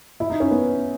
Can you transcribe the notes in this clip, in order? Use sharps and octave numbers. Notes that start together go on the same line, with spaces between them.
E4
D#4
C#4
B3